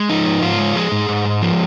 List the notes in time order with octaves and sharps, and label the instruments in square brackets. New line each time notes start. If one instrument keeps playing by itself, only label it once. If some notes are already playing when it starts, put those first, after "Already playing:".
Already playing: [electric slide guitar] G#3
F3 D#4
G#2
G#2 F4
G#3
F3 G#4
G#2
G#2
G#3
F3